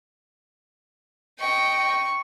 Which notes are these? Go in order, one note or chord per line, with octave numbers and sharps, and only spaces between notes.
D#5 G5 C#6